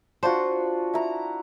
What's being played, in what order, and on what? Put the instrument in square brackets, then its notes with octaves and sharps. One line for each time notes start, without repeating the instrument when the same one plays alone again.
[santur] D4 F4 F#4 [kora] C5
[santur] E4 A#5